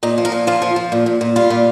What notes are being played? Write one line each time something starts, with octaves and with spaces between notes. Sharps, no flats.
A#2 D#4
F3
A#4
A#2
F3 F4
F3
F3
A#2
A#2
A#2
G3 F4
A#2